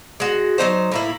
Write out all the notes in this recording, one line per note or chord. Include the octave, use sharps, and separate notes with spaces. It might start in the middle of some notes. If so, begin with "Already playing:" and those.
G#3 F#4
F#3 C#4 D#4 C5
A2 A#3 E4